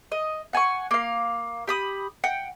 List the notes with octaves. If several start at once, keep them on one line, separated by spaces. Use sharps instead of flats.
D#5
F#5 G#5 A5 C#6
A#3 F5
G4 B5 D#6
F#5 G5